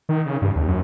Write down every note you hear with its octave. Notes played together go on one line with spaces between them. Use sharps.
D#3
C#3
G2
D#2
F#2